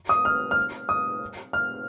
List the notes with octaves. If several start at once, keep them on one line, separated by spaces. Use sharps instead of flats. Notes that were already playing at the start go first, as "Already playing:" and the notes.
D#6
F6
F6
D#6
F6